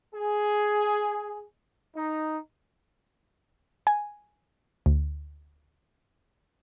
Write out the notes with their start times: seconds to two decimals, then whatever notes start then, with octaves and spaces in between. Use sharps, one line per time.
0.14 G#4
1.95 D#4
3.87 G#5
4.86 D2